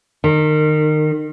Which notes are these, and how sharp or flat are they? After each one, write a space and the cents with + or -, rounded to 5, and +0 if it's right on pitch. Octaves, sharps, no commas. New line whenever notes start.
D#3 -25